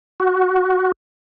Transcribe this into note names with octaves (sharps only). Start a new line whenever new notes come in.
F#4